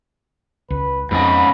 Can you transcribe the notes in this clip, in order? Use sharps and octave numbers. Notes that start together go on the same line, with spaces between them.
C#2 B4
F2 G#2 C#3 D#5 B5